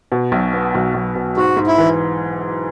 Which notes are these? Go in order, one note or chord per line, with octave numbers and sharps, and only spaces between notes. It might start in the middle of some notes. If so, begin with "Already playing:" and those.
B2
B1
B3
B1
B1
B2
G#2 F#4
G#2
E4
E3